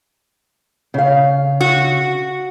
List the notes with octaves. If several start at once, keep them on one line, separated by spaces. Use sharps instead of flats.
C#3 F5
F#4